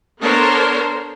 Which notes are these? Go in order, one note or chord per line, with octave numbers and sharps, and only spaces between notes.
B3 D4 A4 A#4 C5 C#5